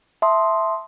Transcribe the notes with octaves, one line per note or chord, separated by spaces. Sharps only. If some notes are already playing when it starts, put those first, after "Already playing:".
E5 A5 C6 D#6